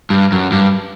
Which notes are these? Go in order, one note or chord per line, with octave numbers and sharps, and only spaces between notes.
G2
F#2
G2